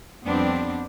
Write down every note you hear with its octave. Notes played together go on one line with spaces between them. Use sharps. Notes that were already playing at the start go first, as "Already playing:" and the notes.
F2 G3 B3 C4 D4